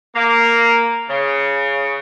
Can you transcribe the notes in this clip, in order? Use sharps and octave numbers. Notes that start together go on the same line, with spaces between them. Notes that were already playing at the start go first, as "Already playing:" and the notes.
A#3
C#3